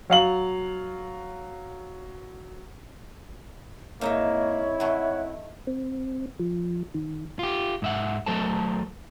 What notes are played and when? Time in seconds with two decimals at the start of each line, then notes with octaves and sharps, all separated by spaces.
0.10 F#3 F5 F#7
4.01 G#2 A#3 C4 D#4 E4 C#5 E5
4.80 D#3 A3 F#5
5.67 C4
6.40 F3
6.94 D#3
7.39 F4 G4
7.82 G#2 E5 F#5
8.26 F#3 A3 A4 A#4 C5 A5